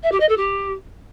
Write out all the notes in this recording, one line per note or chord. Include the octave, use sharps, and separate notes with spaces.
E5
G4
D#5
A4
G4